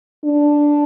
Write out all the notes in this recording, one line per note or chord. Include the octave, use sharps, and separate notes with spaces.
D4